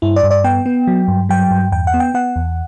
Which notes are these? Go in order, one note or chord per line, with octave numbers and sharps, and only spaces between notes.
G2 E4
D5
G2
D5
B3 G5
B3
F#3
G2
F#3 G5
G2
E2 G5
F#5
B3
G5
B3 F#5
E2